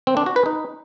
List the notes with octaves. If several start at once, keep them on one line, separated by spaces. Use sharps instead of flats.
C4
D4
F#4
B4
D#4